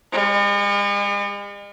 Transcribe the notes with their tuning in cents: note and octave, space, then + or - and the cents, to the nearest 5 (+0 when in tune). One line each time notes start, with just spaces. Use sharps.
G#3 -45